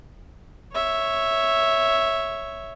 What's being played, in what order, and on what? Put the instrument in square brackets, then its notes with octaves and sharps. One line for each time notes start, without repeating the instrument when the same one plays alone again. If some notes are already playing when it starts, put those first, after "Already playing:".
[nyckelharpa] C#5 E5